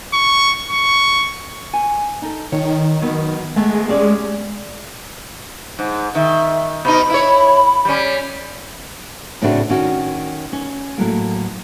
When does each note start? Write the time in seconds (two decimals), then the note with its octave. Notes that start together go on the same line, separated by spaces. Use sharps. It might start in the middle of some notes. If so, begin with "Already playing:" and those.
0.13 C#6
0.70 C#6
1.73 G#5
2.22 D#4 A4
2.52 D#3 C#5
3.02 F#3 B3
3.56 G#3 A3 B3
3.88 G3 C#4 D5
5.79 G#2
6.15 D#3 E5
6.85 B2 D#4 B5
7.10 E4 C#5
7.85 G3 C#4
9.42 A2 C#3 A3 C4 D4 F#4
9.69 D#3 C#4 F#4
10.52 C#4
10.98 A2 F#3 A#3